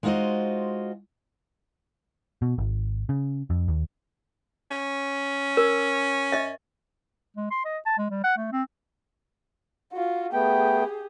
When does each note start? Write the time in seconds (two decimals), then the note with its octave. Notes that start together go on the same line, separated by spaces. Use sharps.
0.03 G#3 D#4 F4 F#4 C5 D#5
2.42 B2
2.58 G#1
3.09 C#3
3.50 F2
3.68 D#2
4.71 C#4
5.57 A#4
6.32 D#5 E5
7.37 G#3
7.51 C6
7.65 D#5
7.86 A5
7.98 G#3
8.11 G3
8.24 F#5
8.37 A3
8.52 C4
9.93 F4 F#4
10.33 A3 B3 G4 G#4 G5